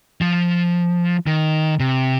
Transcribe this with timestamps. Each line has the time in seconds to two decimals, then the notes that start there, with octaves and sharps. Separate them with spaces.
0.21 F3
1.27 D#3
1.80 C3